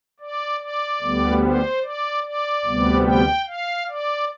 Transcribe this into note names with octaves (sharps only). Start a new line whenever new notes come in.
D5
D5
D2 D3 G3 B3
C5
D5
D5
D2 C3 G3 B3
G5
F5
D5